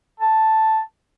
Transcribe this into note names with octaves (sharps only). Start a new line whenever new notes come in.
A5